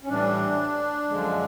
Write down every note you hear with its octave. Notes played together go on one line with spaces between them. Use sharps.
C#4
A2 E3 G3 D4
F#2 D3 F3 G#3